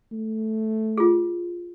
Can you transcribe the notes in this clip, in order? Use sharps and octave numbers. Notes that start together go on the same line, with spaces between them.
A3
F4 G#4